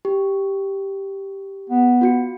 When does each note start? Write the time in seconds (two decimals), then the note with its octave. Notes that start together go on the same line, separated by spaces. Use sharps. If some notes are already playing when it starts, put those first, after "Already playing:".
0.05 G4
1.70 B3
2.01 F4 F#4 C#7